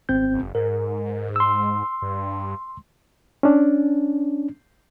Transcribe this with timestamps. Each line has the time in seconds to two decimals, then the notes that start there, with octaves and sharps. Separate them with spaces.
0.09 G#1 C4 G6
0.34 F#1
0.55 G#2 A#4
1.36 C6 E6
2.02 G2
3.43 C#4 D4